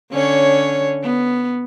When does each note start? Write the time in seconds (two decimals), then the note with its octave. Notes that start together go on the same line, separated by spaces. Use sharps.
0.12 D3 C#4 C#5
1.03 B3